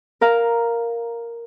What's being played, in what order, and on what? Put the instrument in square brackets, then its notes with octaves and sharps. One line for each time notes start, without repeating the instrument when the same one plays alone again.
[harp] A#4 F5 A#5